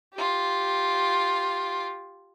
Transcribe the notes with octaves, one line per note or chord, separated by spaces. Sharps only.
F4 G4